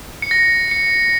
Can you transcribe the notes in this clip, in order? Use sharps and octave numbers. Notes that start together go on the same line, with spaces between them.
C#7
A#6
C#7